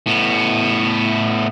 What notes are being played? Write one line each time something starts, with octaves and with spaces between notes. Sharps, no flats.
A2 B3